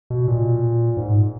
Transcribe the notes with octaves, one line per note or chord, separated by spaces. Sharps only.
B2
A#2
G#2